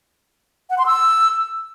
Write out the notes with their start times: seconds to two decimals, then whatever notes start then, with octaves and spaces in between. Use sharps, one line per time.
0.70 F#5
0.78 C6
0.86 E6